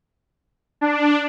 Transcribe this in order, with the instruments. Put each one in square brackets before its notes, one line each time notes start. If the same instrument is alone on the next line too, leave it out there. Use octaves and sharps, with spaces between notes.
[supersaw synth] D4